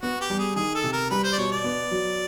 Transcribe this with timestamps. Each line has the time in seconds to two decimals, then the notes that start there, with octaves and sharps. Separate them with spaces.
0.02 B3 F#4
0.21 G4
0.30 G3
0.39 G#4
0.56 D#3 G#4
0.75 A4
0.84 C3
0.93 A#4
1.11 G3 B4
1.24 C5
1.33 D5
1.38 B2 C#5
1.52 D5
1.64 B3
1.91 F#3